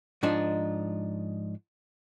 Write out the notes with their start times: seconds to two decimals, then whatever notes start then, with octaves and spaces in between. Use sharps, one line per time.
0.23 G#2 F3 D4 D#4